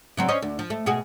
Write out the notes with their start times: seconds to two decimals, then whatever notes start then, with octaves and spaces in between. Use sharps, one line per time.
0.17 C#3 F#3 C4
0.28 C#4 C5 D#5
0.42 D2
0.59 F3
0.70 A3
0.86 B2 F#4 G#4